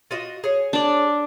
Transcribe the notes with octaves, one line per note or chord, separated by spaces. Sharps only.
F4 F#4 D#5
G#4 C#5
D4 D5